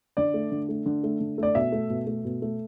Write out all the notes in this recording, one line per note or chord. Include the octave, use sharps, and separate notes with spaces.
D3 D5
A3
D3
A3
D3
A3
D3
A3 D5
B2 E5
A3
B2
A3
B2
A3